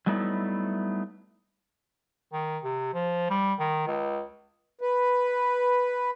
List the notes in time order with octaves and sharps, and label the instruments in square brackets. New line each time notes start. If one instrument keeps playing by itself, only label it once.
[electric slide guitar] F#3 G3 A3 B3 D#4 E4
[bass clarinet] D#3
C3
F3
G3
D#3
C#2
[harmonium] B4